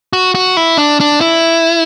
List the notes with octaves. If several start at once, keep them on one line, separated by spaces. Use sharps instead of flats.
F#4
F#4
E4
D4
D4
E4